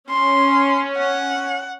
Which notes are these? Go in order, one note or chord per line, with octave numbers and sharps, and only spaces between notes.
C#4 C6
F#5